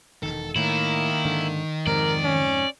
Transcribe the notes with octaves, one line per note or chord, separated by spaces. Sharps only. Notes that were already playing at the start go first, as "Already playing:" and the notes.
E1 C2 D#3 A4
A2 D#3 A#3 E4
G#2 D3
F2 G#2 C3 A#4 D5
C#4